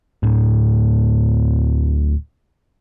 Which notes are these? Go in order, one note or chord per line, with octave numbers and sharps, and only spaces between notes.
D1 A2